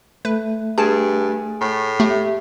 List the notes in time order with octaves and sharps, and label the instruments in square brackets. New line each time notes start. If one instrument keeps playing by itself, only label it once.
[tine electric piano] A3 [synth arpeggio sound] B4
[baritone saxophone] G2 [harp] G#4 [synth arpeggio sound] A5
[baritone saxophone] A2
[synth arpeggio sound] A3 [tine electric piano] G4 E5